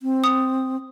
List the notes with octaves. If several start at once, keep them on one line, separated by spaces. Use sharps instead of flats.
C4
D#6